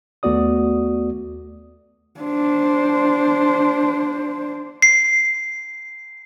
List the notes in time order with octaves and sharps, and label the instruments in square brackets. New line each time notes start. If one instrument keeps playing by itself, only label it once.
[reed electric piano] D#2 A3 B3 F#4 D5 D#6
[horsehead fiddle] D4 C5
[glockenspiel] C7